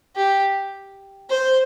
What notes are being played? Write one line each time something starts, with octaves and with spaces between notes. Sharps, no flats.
G4
C5